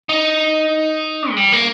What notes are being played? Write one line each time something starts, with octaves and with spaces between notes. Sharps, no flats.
D#4
G#3
G3
A#3